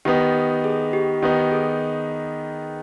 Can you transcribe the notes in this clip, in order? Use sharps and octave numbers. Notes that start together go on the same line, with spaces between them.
D#3 B3 D#4 G4
G4
G#4
G4
D#3 B3 D#4 G4
G#4